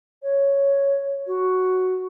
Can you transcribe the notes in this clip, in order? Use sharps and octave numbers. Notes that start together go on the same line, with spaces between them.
C#5
F#4